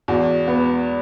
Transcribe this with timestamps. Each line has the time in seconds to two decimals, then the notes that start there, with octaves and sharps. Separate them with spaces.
0.08 E2 F#4
0.48 B3